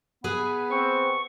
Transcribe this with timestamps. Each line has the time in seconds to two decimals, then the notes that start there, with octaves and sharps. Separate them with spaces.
0.24 B3 G#4 B4 G#5
0.71 C4 C#6